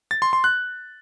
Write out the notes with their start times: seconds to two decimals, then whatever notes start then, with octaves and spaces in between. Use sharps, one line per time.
0.11 A6
0.22 C6
0.33 C6
0.44 F#6